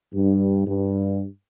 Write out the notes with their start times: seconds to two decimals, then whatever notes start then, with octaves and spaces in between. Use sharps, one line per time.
0.14 G2
0.67 G2